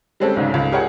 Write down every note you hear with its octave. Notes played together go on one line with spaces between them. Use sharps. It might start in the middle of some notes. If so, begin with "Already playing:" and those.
G3 G#3 C4 C#4 A4
B1 G#2 C#3
C#2
G4 G#4 A#4 C#5 F#5